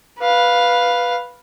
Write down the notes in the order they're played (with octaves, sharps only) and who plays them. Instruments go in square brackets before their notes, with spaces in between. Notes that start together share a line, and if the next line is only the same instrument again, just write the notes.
[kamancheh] B4 F5